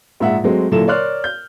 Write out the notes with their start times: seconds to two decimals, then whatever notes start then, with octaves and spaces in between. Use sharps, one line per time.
0.20 A#1 G#2 E5 F#5
0.44 F#3 G#3 A3 C4 F#4
0.71 A#2 D3 F#3 E4 A4 E7
0.87 A#4 C#5 D5 C6 F6 F#6
1.24 G6